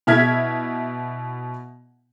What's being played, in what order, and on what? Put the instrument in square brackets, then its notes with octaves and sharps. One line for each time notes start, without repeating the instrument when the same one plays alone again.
[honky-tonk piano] B2 E4 E5 F6 G#6 B6